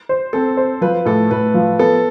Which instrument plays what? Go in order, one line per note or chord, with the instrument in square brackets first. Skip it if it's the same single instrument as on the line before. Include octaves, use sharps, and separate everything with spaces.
[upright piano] C5
[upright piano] C4 [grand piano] A4
[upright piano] C5
[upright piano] F3 [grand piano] B4
[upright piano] A2 [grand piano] A4
[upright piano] A2 [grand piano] B4
[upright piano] F3
[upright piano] B3 [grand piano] A4